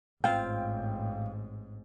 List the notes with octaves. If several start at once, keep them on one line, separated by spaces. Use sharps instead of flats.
A1 G#2 C4 F4 F5 G5